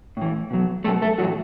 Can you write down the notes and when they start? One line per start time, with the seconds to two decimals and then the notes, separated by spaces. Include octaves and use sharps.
0.17 A2 E3
0.51 B2 F#3
0.84 B2 F#3 A3 A4
1.02 A3 A4
1.18 A2 E3 F#3 F#4